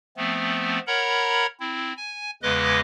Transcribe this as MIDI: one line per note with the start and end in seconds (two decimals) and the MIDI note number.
0.17 0.79 53
0.17 0.79 57
0.17 0.79 59
0.17 0.79 60
0.87 1.46 70
0.87 1.46 73
0.87 1.46 78
0.87 1.46 82
0.87 1.46 83
1.60 1.93 60
1.60 1.93 64
1.97 2.31 80
2.43 2.80 40
2.43 2.80 49
2.43 2.80 56
2.43 2.80 71
2.43 2.80 75
2.43 2.80 86